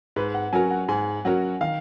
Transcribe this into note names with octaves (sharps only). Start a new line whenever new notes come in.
G#2 B4
F#5
F#3 C#4 F#4 A#4 G#5
F#5
G#2 G#5
F#3 C#4 F#4 A#4 F#5
D#3 F5